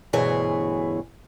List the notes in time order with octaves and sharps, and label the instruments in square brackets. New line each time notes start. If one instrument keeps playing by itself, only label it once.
[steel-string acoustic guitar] D2 G2 B2 E3 G#4 C#5